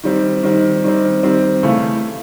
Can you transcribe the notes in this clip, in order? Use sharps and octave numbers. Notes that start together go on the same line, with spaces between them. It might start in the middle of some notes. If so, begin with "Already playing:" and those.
D#3 G3 C4
D#3 G3 C4
D#3 G3 C4
D#3 G3 C4
C#3 E3 A3